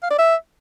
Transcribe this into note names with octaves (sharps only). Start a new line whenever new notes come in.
F5
D5
E5